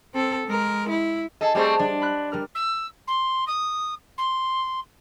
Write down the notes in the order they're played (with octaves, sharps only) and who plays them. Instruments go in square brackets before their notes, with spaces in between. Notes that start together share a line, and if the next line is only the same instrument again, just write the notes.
[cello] C4 A4
G#3 A#4
E4
[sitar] G#4 A4 [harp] D#5
[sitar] G3 A3 C4 [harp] G#4 A5
[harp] G3 [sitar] D4
[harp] B5 F#6
G3 A#4 F6
[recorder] E6
C6
D#6
C6